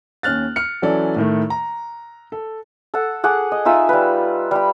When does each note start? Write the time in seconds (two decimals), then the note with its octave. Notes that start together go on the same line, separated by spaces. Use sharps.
0.23 D#2 C#4 F6 F#6 A6
0.56 F6 C#7
0.82 E3 F#3 C#4 A4 D5
1.16 A2 D#3 A3
1.50 A#5
2.32 A4
2.94 A4 F#5
3.24 G#4 F#5 A5 D6
3.52 D#5
3.65 D#4 F4 E5 G#5
3.89 G3 B4
4.51 G3 B5